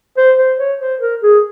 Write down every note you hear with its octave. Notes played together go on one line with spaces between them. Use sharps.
C5
C5
C#5
C5
A#4
G#4